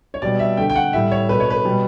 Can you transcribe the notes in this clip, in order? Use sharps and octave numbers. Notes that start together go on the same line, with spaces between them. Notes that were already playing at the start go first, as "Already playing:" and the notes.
C#5
B2 G3 D5
E5
D3 A3 G5
G5
F#5
A2 G3 E5
C#5
B2 A3 B4
C#5
B4
B2 G3